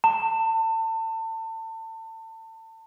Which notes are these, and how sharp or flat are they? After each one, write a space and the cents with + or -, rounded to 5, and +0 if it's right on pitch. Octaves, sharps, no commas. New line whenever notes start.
A5 +30